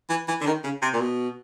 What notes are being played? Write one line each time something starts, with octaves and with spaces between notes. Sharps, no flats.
E3
E3
D3
D#3
C#3
C3
A#2
B2